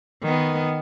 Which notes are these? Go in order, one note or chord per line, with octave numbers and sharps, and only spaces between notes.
D#3 B3